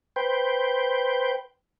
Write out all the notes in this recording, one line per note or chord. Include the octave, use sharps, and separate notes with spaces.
B4 C5 G5